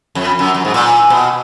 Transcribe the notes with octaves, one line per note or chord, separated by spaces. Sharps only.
F2
F#2
F#2
G#2
A#2
B2